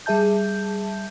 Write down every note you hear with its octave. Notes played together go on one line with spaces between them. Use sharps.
G3 G#4 E5 A5 G6